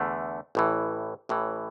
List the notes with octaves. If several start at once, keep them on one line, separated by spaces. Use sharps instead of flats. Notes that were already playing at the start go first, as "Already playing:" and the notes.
Already playing: E2 D3 A3
A1 A2 E3
A1 A2 E3